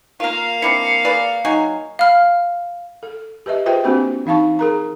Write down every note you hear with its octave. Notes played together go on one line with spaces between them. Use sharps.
A#3 F4 A#4 F5
C4 D4 E4 C7 C#7
G#4 B4 D5
F#3 D#4 G#5
F5 B5 F6
A4
G4 B4 D#5 E5
F4 G#4 B4 C5 E5 G5
A#3 C4 D4 F#4 G4 C5
E3 D#4 F5 A5 C#6
G#4 A#4 A#5